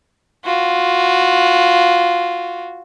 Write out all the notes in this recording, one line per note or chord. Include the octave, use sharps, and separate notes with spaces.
F4 F#4